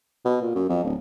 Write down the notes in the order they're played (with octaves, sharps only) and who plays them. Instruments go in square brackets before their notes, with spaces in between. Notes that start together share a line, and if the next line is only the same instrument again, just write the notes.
[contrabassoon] B2
A#2
F#2
F2
D1